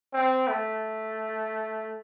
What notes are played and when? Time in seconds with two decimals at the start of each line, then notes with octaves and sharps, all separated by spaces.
0.13 C4
0.48 A3